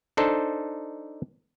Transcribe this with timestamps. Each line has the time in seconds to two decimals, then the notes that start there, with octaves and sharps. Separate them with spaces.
0.17 D4 D#4 A4 C5